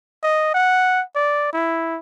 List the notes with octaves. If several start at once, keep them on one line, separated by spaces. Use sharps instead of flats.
D#5
F#5
D5
E4